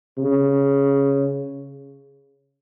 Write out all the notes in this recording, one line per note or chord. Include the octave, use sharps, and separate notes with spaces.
C#3